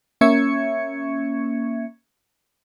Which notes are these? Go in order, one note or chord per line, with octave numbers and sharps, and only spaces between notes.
A#3 C#4 E5 C#6 G#6 C#7